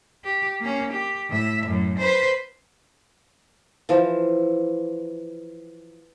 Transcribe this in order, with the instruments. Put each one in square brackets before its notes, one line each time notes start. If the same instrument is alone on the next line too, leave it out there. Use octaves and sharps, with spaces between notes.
[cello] G4
A#3 C#4
G4
A2 E5
F#2 A2
B4 C5
[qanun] E3 F3